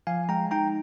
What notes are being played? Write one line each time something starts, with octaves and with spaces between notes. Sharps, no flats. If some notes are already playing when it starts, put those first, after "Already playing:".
F3 F5 G#5
G#3 G5 A#5
D#4 G5 A#5